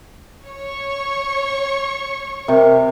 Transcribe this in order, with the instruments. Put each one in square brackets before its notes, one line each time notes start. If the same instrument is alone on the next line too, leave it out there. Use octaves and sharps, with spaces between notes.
[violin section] C#5 C#6
[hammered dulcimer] C3 [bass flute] A#4